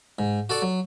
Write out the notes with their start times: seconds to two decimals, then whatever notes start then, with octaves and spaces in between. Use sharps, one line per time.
0.19 G#2
0.50 F#4 A4 D5
0.62 F#3